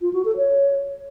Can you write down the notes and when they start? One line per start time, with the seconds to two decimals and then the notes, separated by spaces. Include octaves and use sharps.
0.01 F4
0.13 F#4
0.25 A4
0.37 C#5